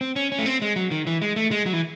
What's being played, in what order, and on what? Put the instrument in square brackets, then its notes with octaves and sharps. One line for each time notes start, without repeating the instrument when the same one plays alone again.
[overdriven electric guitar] C4
C#4
C#4
A3
C4
G#3
F#3
D#3
E3
G#3
A3
G#3
F#3
E3